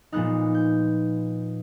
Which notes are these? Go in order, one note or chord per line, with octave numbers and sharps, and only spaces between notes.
A#2 F3 G#3 B3 D#4 F#6
G6